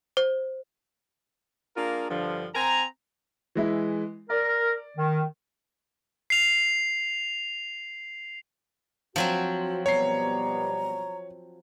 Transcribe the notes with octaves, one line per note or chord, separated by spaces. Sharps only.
C5
A#3 D4 F4 G#4 A#4
G2 D3 F3
C4 G#5 A#5
E3 G#3 E4
A#4 D5
D#3
C7 F7
F3 F#3 C4 F#4
B2 G3 B3 C#5 A#5 C7